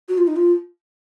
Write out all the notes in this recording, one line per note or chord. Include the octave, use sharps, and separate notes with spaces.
F#4
F4
D#4
F4